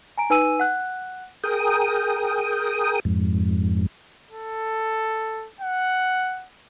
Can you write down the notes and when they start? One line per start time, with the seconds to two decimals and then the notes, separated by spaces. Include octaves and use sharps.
0.18 G#5 A#5 D7
0.30 D#4 B4 G#5 E6 D#7
0.60 F#5 F#6
1.44 G#4 A#4 G5 D#6
3.05 F2 G#2
4.31 A4
5.61 F#5